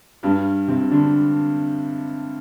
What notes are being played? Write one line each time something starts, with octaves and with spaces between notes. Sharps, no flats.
G2 G3
C3 C4
D3 D4